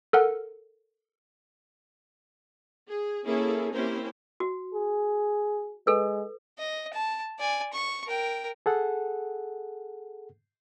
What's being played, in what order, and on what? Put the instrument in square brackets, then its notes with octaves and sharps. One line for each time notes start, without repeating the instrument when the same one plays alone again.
[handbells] A4 A#4 F#5
[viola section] G#4
A#3 C#4 E4 G#4 A4
A#3 C4 C#4 E4 G4 C5
[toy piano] F#4
[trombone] G#4
[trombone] G#3 [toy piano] A4 B4
[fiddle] D#5
A5
D5 G#5
C#6
A#4 G5
[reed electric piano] G#4 A4 F#5